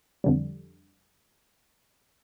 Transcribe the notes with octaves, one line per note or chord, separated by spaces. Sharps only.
F2 D3 G3